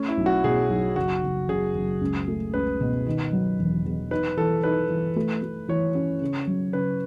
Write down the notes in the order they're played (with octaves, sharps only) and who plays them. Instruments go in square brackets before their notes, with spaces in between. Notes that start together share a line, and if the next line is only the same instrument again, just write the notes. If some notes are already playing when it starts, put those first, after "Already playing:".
Already playing: [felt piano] A3 [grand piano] C#4
[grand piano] E4
[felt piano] B1
[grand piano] F#4
[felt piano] B2 [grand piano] G#4
[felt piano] B1
[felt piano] F#1 [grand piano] F#4
[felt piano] F#1
[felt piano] F#1 [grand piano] G#4
[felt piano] F#1
C#2
A3
[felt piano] C#2 [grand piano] B4
[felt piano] B2
D#3
F#3
E1
E2
[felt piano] D#4 [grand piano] B4
[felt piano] E3 [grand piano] A4
[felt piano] D#4 [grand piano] B4
[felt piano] E3
A3
A3
[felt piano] E3 [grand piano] C#5
[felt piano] C#4
C#3
F#3
[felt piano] C#3 [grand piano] B4